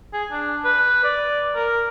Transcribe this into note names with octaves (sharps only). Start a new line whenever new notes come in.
G#4
D4
B4
D5
A#4